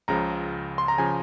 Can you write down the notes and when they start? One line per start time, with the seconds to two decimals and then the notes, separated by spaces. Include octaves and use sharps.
0.08 C#2 C#3 F3 A#5
0.78 C6
0.88 A#5
0.98 C#3 F3 G#5